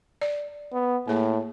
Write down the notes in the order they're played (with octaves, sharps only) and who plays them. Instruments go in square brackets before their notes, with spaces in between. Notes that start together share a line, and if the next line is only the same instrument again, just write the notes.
[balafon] D5
[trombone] B3
[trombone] A2 [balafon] A#3 G#4